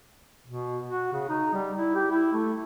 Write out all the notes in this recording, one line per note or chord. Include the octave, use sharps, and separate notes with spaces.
B2
F#4
C#3
D#4
G3
E4
G4
E4
A3